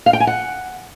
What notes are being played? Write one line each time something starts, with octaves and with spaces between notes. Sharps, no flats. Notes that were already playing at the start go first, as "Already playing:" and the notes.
F5
G5
G#5
F#5